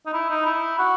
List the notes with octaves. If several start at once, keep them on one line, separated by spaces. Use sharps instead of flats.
D#4
E4
D#4
E4
F#4